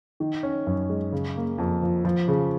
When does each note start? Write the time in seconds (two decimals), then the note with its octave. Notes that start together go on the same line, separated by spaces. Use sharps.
0.20 D#3
0.43 C#4
0.67 F#2
0.89 G#3
1.12 C#3
1.36 A#3
1.58 F2
1.82 F3
2.05 F3
2.28 C#3